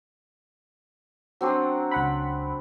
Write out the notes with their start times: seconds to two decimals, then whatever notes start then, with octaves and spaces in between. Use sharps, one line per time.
1.41 F#3 C4 D4
1.91 C#2 F#5 B5